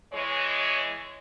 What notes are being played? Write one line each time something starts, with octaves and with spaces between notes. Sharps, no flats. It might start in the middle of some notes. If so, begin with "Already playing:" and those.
E3 G#3 C#5